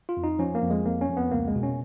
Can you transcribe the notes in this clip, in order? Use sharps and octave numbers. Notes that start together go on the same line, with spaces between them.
F4
F2
D#4
F3 C#4
A#3
F2
G#3
F2 A#3
C#4
F2
B3
C#2 A#3
G#3
B2
C#4